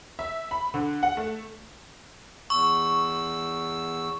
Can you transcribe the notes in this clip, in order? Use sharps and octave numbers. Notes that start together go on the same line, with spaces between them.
E5
B5
D3
F#5
A3
E2 C#6 E6